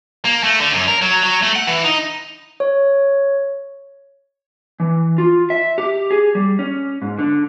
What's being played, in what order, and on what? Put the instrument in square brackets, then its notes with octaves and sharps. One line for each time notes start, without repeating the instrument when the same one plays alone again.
[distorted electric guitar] A#3
A3
D3
F#2
A#4
F#3
F#3
A3
F#5
E3
D#4
[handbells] C#5
[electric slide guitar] E3
F4
E5
G4
G#4
G3
C#4
G#2
D3